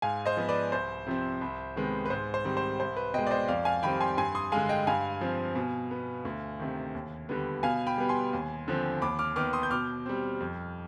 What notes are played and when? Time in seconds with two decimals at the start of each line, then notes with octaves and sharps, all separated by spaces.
0.02 G#2 F5 G#5
0.26 C5 D#5
0.37 F3 B3
0.49 B4 D5
0.72 C2 C5
1.07 C3 F3 C4
1.41 C2
1.76 C3 D#3 G#3 B3
2.06 B4
2.10 G#2 C5
2.34 C5
2.44 D#3 G3 C4
2.57 C5
2.80 C2 C5
2.97 B4
3.14 B2 G#3 D#5 G5
3.27 D5
3.31 C5 D#5
3.48 F2 D5 F5
3.65 F5 G#5
3.83 D#3 G3 C4 G5 B5
4.01 G#5 C6
4.18 G2 G#5 C6
4.35 C6 D#6
4.52 D3 G#3 F5 G#5
4.69 D#5 G5
4.87 G2 F5 G#5
5.21 F3 C4
5.55 B2
5.91 B3
6.25 D2
6.59 C3 D#3
6.95 D#2
7.29 D3 G3 B3
7.63 B2 F5 G#5
7.87 G5 B5
7.97 G3 B3
8.09 G#5 C6
8.33 D#2
8.68 D3 F3 C4
9.02 D#2 B5 D6
9.19 D6 F6
9.36 D#3 B3 D6 F6
9.53 C6 D#6
9.63 G6
9.71 B2 D6 F6
10.06 G3 C4
10.40 F2